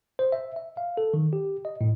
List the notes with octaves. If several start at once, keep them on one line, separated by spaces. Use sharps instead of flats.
C5
E5
E5
F5
A4
D#3
G4
D#5
A2